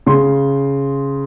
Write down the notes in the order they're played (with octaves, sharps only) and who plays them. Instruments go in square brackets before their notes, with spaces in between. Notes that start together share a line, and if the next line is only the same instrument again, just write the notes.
[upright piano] C#3 C6